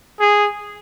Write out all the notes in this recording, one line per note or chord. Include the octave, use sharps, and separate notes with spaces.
G#4